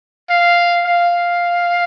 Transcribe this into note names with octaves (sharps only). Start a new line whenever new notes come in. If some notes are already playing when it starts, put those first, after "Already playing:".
F5
F5